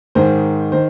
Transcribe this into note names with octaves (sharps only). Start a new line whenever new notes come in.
G#2 D#3 C5
D#3 C5